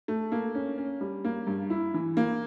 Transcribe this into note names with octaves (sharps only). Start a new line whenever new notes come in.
A3
A#3
C#4
C#4
G3
A#3
G2
E4
E3
A#3